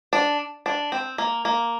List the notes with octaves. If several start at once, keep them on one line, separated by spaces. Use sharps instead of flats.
D4
D4
C4
A#3
A#3